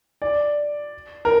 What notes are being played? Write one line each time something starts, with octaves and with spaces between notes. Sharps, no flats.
D5
A#4